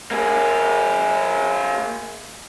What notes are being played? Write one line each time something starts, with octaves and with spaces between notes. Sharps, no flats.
A#3 G#4